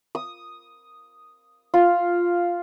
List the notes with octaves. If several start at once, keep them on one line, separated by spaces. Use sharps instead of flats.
D#6
F4